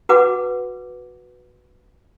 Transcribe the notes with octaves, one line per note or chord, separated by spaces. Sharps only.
F#4 B4 F#5 D6